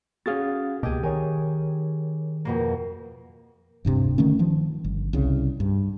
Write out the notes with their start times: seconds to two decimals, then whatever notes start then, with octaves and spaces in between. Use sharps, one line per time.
0.26 C#4 F#4 G#4 F5 A6
0.83 C#2 B2 A#3 G4 G#4 D#5
1.03 D#3 A#4 C#5 G#5
2.45 F2 B2 A#3
3.85 D1 G2 C3
4.18 D3 D#3 A3 C#4
4.39 D#3 F3
4.84 G1
5.13 C2 C#3
5.60 G2